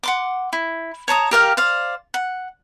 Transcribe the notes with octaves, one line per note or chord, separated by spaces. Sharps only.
F#5 C6 D6
E4
C#5 A5 A#5 D#6
G4 A#4 F5 G5
C5 D5 F5
F#5